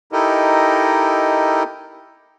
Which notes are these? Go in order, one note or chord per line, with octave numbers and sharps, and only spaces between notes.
D#4 E4 G4 A4 A#4 D#5